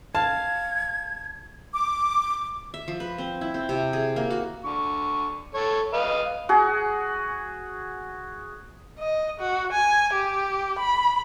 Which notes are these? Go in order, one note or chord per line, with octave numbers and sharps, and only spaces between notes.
F5 A5 G#6
D6
E5
F3
B4
C4
E4
C4
C3
G#4
A#3
F#4
D3 C#6
A4 C#5
B4 D#5 F5
F#4 G#4
D#5
F#4
G#5
G4
B5